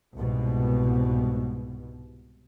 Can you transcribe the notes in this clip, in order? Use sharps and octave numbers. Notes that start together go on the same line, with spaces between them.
C2 G#2 B2